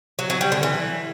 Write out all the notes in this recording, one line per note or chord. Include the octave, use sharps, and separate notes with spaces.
F#3
F#3
G3
D3
E3